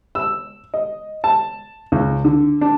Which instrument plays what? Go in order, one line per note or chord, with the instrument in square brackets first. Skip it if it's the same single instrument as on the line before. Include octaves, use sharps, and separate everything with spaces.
[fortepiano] E6
D#5
A5
C#2
D3
D4